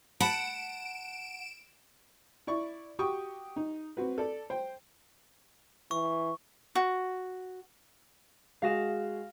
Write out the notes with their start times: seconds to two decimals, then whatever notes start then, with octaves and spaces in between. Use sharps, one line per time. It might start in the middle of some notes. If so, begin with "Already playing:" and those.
0.20 F#5 A5 B5 D7 E7
2.47 E4 D5 C#6
2.99 F#4 G4 G5 C#6 D#6
3.56 D#4
3.97 C4 F#4 B4
4.18 A4 D5
4.50 C5 G5
5.91 E3 C#6
6.75 F#4
8.62 G#3 F#4 G#4 F5 A#6 E7